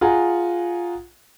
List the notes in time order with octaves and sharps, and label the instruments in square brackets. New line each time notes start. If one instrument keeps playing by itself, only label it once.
[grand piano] F4 G#4 F#5 G#5 A#5